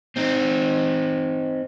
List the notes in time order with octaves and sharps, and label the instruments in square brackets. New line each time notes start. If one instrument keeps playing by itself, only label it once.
[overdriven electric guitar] C4 D#4